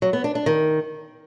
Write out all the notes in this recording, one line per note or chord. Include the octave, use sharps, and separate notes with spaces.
F#3
B3
D4
D4
D#3